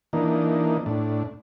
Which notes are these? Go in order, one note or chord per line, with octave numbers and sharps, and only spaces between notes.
E3 A#3 D4 D#4
A2 D4